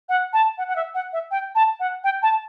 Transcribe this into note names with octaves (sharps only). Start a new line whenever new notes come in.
F#5
A5
F#5
F#5
E5
F#5
E5
G5
A5
F#5
G5
A5